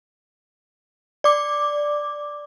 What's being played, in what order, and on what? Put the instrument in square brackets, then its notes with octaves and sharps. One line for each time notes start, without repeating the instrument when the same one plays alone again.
[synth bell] D5 D6